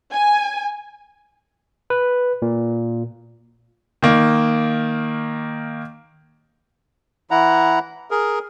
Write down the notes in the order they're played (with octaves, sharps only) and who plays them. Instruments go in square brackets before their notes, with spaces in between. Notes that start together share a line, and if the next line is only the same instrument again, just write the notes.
[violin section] G#5
[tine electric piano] B4
A#2
[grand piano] D#3 A#3
[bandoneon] E3 E4 F#5 A#5
G#4 A#4